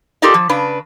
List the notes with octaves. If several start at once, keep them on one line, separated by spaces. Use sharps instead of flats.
F4 G4 A4 A#4 D5 D#5
F3
C#3 D4 B4